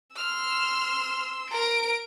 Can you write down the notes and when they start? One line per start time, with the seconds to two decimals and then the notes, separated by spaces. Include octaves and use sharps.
0.16 C6 E6 F6
1.51 A#4 D7